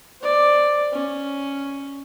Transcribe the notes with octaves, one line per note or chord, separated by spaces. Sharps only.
C5 D5
C#4